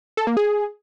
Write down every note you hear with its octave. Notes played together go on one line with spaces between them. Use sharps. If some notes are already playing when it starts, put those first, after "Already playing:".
A4
A#3
G#4